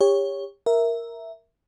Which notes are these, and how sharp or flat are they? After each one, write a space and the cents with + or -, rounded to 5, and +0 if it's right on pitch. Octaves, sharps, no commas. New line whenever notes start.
G4 +30 C#5 +0
A#4 +0 E5 +0